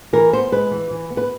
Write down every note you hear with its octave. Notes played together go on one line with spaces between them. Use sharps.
E3 A#4
B3 C5
G#3 B4
E3
E3
B3
B4